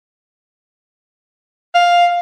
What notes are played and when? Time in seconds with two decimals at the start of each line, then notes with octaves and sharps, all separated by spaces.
1.75 F5